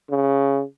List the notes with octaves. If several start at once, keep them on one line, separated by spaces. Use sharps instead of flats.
C#3